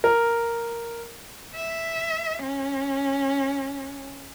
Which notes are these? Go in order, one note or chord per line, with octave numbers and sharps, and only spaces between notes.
A#4
E5
C#4